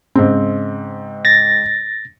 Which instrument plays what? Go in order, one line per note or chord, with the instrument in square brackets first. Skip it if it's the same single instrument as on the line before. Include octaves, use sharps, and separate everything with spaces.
[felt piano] G#2 C#3 C4
[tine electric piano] A6 A#6